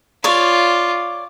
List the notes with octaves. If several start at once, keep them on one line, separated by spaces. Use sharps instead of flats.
F4 C#5 D5